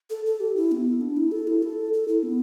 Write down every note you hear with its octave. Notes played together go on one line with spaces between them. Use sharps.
A4
A4
G4
E4
B3
D4
E4
A4
E4
A4
A4
E4
B3